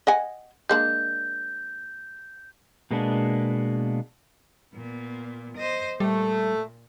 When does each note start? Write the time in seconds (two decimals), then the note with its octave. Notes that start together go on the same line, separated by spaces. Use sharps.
0.07 D#5 F#5 G#5
0.69 G#3 A#3 D4 G6
2.91 B2 G#3 A#3 B3 D4
4.73 A#2 B3
5.57 C5 D#5
6.00 A#2 G3 A3